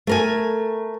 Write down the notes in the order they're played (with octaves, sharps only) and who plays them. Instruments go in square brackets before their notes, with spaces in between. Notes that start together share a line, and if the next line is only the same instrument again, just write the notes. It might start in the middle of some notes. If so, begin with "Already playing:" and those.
[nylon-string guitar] A3 A#4 G#5